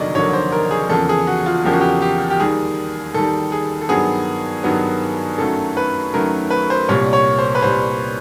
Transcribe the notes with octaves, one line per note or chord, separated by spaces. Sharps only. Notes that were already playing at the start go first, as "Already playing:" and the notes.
Already playing: F1 D#2 D3 F#3 A#3 D5 D#5
F1 D#2 D3 F#3 A#3 C#5
C5
A#4
G#4
E2 C#3 F3 A#3 A4
G#4
F#4
F4
E2 C#3 F3 A#3 G4
F#4
G4
G4
G4
D#2 D#3 G3 G#4
D#2 D#3 G3 A4
G#4
A4
G2 D#3 F#3 B3 G#4
G2 D#3 F#3 B3
F#2 D#3 F#3 A3 A4
B4
F#2 D#3 F#3 A3 A#4
B4
C5
C2 A#2 G3 C#5
C#5
C5
B4
C2 A#2 G3 C5